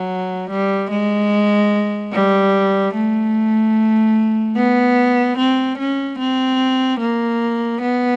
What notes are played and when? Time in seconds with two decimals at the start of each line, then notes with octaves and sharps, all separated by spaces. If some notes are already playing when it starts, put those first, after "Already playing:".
Already playing: F#3
0.50 G3
0.90 G#3
2.12 G3
2.94 A3
4.56 B3
5.38 C4
5.78 C#4
6.19 C4
7.00 A#3
7.81 B3